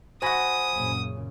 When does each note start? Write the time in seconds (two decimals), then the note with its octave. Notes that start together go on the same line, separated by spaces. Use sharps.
0.22 F#4 C5 F#5 G#5 B5 D#6
0.73 F#2 A#2 C#3